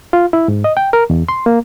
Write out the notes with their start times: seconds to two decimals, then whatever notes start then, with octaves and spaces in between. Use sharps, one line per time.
0.13 F4
0.33 E4
0.48 G#2
0.64 D#5
0.77 G5
0.93 A#4
1.10 E2
1.29 C6
1.46 A#3